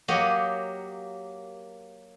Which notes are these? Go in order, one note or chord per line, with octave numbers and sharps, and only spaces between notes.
F#3 A#3 G4 C#5 D#5 F#5